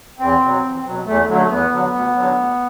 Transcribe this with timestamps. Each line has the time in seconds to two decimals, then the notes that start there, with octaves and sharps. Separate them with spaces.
0.19 E2 C4
0.41 B2 F#3
0.63 E2
0.85 B2 F#3
1.05 E2 A3
1.28 D3 F#3 A3
1.49 E2 B3
1.71 D3 F#3
1.92 D2
2.15 D3 F#3
2.36 D2